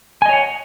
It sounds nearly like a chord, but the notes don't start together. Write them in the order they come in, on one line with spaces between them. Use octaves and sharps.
G#5 D#5 C#5 F#5